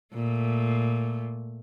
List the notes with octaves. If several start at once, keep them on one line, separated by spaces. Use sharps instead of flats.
A#2 A3